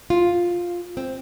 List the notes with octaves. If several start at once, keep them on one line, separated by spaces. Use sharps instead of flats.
F4
C4